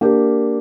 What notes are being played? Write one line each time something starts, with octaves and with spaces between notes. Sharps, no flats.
A#3 D4 G4 A#4